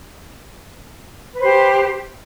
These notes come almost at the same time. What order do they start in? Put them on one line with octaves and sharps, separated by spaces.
B4 C5 G4